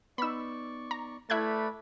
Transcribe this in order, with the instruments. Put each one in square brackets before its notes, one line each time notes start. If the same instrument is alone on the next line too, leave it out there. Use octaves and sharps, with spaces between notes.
[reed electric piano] B3 D#4 [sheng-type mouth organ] D5 C#6 [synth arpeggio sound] B5 E6
[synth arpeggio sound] A#5
[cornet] A3 [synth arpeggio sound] E4 F#6 G#6 [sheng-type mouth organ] B4 D5 B5